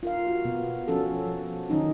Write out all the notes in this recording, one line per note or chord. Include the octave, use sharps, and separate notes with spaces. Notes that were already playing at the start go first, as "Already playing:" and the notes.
F4 A#4 F5
F#4
B2 B3
F3 C#4 F#4 A4
F3
D#3 F#3 C#4 D#4